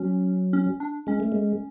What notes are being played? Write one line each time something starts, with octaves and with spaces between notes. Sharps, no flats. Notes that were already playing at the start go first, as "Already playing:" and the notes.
Already playing: F#3 C#4
C#4
D4
G#3 C#4
A3
G#3